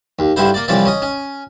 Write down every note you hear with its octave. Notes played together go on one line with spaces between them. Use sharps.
D#2
G2 D3 E4 C5
A#3 D5
C2 E3 F3 C#5 D5
C#4 D#5
C#4